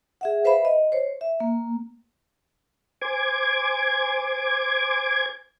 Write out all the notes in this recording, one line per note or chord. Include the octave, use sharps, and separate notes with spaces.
G#4 E5 F#5
B4 C5 E5 F5 B5
D#5
C5 C#5
E5
A#3
C5 G#5 D6 G#6